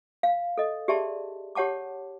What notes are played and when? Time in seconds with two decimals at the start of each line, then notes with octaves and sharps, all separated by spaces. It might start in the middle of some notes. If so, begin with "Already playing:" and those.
0.23 F5
0.58 A4 D#5
0.88 G4 G#4 D5 E5 A5 C6
1.55 G4 C#5 F#5 A5 D6